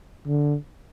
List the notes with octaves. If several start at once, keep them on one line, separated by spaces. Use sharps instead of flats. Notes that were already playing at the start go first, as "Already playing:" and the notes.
D3